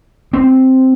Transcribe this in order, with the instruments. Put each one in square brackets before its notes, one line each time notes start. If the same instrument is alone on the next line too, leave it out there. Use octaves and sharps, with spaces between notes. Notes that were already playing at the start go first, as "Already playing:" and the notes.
[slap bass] C4